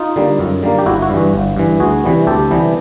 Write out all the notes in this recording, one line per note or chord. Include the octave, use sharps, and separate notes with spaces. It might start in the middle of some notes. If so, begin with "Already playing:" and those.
Already playing: D#4 F4
D3 G3 A#3
F#2
D3 G3 A#3
G4
G1 E4 F#4
E4 F#4
G2 E3
G1
G2 E3
D2 F#4 G#4
C3 E3 G3 B3
D2 G4 A4
C3 E3 G3 B3